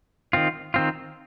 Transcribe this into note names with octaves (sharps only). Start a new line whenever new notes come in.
D#3 C4 F4
D#3 C4 F4